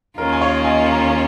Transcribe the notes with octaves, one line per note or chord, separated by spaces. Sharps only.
D#2 D#3 A#3 C#4 F4 A#4
G#5
C#5 F5
D#5 G#5
F5 A#5